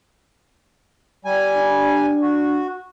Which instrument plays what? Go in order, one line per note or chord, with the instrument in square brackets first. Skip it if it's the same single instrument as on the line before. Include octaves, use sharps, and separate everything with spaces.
[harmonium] G3 G#5
[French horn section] D4
[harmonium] F#4